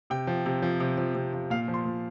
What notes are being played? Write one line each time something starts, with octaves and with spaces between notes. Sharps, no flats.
C3 G5
F3
C3
F3
C3
F3
C3
F3
A#2 F5
F3
C6
A#2